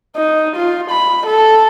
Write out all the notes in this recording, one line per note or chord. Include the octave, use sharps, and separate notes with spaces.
D#4
F4
B5
A4